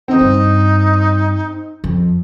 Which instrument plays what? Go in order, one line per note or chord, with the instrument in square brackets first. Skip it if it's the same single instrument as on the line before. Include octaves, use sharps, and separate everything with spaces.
[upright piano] C4 [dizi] D#4
[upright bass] G2
F2